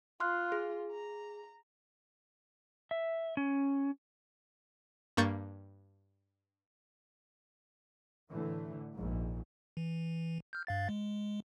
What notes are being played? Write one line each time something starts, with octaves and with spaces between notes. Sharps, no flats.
F4 C6 F6 F#6
G#4
A#5
E5
C#4
G2 A#3 C#6 G6 A6
A2 D3 E3 A3
A#1 G#2
E3
F6 G6
G2 F5 A6
G#3